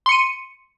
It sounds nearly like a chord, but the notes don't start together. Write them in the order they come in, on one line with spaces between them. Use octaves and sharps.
C6 C#7 D#7